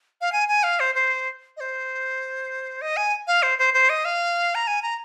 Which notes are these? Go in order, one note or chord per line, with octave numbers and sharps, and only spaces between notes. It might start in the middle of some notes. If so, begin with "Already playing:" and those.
F5
G#5
G#5
F5
C5
C5
D#5
C5
D#5
G#5
F5
C5
C5
C5
D#5
F5
A#5
G#5
A#5